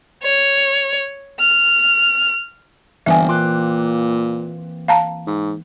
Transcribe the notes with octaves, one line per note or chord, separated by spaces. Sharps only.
C#5
F6
G1 E3 A#3 C4 E5 G#5
A#2 C6 D6 F#6
F5 A5 A#5
G#2